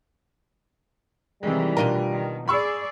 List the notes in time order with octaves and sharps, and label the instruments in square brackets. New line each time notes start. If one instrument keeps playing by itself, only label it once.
[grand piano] C3 G#3 [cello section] D#3 E3 [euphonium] G3
[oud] B2 D4 F4 [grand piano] A#4 D#7
[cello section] D#3
[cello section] G#4 D5 [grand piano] B5 C#6 E6